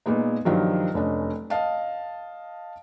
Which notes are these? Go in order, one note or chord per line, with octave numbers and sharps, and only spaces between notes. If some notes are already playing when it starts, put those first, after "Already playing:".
A#2 G#3 B3 D#4
G2 D#3 F3 F#3
F1 C#4 D4 D#5
D#5 F5 A5